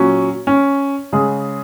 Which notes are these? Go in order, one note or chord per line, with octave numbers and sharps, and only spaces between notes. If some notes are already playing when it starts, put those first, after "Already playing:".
Already playing: A#2 F#3 C#4
C#4
C#3 G#3 G#4